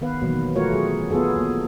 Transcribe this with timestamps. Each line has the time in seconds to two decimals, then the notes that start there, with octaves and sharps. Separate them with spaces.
0.01 D#3 B3 B4 F5
0.21 B2 D#3 E3 F#3 A#3
0.56 A3 F4 F#4 A#4 C#5
0.72 F#3 G#4
1.10 B3 F4 F#4 G#4 A4
1.36 A#3